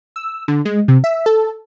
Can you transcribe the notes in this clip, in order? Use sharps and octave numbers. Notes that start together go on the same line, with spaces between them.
E6
D3
G#3
C3
E5
A4